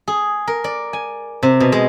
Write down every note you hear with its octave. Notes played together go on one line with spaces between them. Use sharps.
G#4
A#4
D5
G#5
C3
B2
G#3